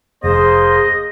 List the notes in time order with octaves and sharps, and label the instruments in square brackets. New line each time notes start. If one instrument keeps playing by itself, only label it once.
[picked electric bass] F1 [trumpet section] A#3 C5 [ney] G#4 [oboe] D#5